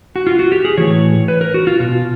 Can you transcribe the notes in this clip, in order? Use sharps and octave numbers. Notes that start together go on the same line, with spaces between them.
F#4
F4
F#4
G4
G#4
A2 E3 C#5
B4
A#4
F#4
F4
B2 F4